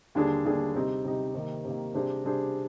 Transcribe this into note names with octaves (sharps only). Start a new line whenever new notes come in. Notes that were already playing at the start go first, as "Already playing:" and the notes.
D#2 D3 G3 D4 G#4
D#2 D3 G3 D4 G#4
C3 G3 C4 D#4
C3 G3 C4 D#4
C3 D#3 A#3
C3 D#3 A#3
C3 G3 D4 G#4 C5
C3 G3 D4 G#4 C5